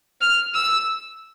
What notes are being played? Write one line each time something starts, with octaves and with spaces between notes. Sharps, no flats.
F6
E6